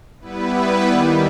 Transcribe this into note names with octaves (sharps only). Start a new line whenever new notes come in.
G3 B3 E4 B4
D#2 D#3 G3